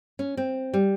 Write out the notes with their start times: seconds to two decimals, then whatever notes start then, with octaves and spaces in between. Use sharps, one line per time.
0.19 C#4
0.37 C4
0.74 G3